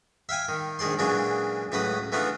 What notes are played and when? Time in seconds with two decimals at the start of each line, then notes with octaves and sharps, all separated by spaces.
0.29 E5 F5 G5 G#5
0.49 D#3
0.79 A#1 D#3 G#3 D5 C6
0.99 A#2 C#3 E3 F#3 G#3 D4
1.72 C#2 A2 C#3 F#3 B4 D#6
2.12 E3 A3 B3 D4 D#4 F4